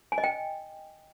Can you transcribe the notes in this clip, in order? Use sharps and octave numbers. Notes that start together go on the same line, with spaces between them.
G#5
D#5
G5